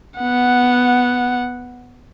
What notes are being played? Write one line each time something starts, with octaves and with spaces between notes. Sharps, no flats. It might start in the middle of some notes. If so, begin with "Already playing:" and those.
B3 F#5